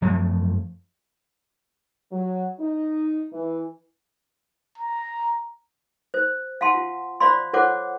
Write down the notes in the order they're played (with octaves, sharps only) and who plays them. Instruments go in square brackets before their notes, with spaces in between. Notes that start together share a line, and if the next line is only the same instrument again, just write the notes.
[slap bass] F#2 F3 F#3 A3
[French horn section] F#3
D#4
E3
[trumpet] A#5
[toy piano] C5
F5 F#5 A5 C6
F4
C5 D5 F5 B5 C6
F4 A4 C5 C#5 F#5 D6